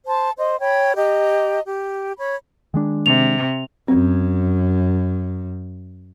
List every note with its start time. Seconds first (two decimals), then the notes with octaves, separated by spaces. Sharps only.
0.07 C5 A5
0.37 C5 D#5
0.61 C#5 G5 B5
0.96 G4 D#5 A#5
1.66 G4
2.18 C#5 B5
2.74 D#3 G#3 D4
3.06 C3 F7
3.88 F#2 C4